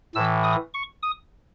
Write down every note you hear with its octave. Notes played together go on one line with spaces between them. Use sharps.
A2 E3 E6
D#6
C#6
D#6